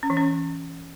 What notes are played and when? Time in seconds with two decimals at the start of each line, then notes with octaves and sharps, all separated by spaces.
0.03 C#4
0.10 E3
0.17 C#4